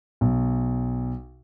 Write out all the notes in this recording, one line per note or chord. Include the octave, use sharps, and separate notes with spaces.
B1